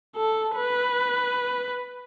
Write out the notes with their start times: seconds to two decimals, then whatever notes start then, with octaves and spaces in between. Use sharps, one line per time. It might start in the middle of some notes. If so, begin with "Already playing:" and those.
0.16 A4
0.56 B4